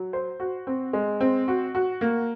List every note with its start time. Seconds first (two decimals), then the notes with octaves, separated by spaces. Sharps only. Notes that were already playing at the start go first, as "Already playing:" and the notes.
Already playing: F#3
0.13 C5
0.40 F#4
0.67 C4
0.93 G#3
1.21 C4
1.48 F#4
1.75 F#4
2.01 A#3